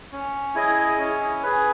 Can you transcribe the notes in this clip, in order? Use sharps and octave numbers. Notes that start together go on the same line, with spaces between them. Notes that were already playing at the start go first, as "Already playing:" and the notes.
C#4
E4 G#4 D#5
C#4
G#4 B4